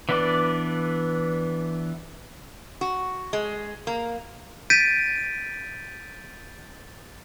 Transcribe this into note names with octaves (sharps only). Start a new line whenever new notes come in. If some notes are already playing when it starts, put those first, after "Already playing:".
E3 B3 D4 B4 D5
F#4
G#3
A#3
G6 A6 B6 D7 D#7